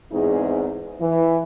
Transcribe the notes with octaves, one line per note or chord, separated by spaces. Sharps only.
E2 G#2 C4 D#4 E4 G#4
E3